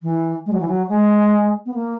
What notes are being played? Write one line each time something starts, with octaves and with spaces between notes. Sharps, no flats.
E3
G#3
F#3
E3
F#3
G#3
B3
A#3